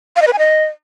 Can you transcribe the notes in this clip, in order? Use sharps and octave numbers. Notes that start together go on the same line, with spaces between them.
F5
D#5
B4
G#5
D#5